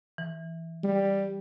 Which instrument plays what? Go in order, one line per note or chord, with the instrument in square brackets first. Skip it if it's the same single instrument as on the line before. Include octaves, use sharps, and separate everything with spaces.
[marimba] E3
[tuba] G3